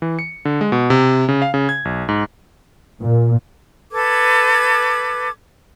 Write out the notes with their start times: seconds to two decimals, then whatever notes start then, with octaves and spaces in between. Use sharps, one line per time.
0.02 E3
0.19 C#7
0.45 D3
0.61 G#3
0.72 B2
0.90 C3
1.29 C#3
1.42 F5
1.54 C#3
1.69 G#6
1.85 B1
2.09 G#2
3.00 A#2
3.91 A4 B4 D6 G#6